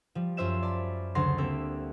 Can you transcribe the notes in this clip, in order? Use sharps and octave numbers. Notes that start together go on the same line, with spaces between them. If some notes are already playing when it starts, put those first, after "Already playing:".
F3 G3
F#2 F4 C5 E5 E7
D5 A5 B5
D2 C#3 F#3 C6 A6 A#6
G3 A#3 C4 A4 E5